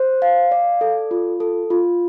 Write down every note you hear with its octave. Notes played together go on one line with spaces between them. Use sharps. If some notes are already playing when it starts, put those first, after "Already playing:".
Already playing: C5
F5
D5
A4
F4
A4
F4